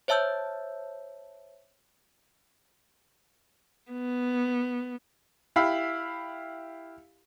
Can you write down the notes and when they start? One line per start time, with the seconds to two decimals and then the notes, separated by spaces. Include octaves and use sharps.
0.08 C5 C#5 E5 A5 E6 G6
3.91 B3
5.56 E4 G4 F5 B5 E6